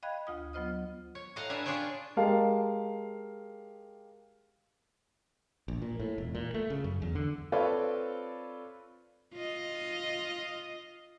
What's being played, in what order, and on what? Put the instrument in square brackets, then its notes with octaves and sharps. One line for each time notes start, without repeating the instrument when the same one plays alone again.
[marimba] D#5 F5 G5 B5 F#6 G#6
D2 F4 D#6
F#3 B3 F4 C5 D#5 F6
[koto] C#5
A2 D#5 F5 F#5 A#5
D4 B4 E5 G#5
D4 F4 G#4 C#5 G5
[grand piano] G#3 G4 A#4 F5 A5
[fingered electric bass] A#1
A#2
A2
E1
A#2
A3
C#3
F#2
E2
D3
[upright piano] C4 F4 A4 B4 C#5 D5
[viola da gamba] F4 D#5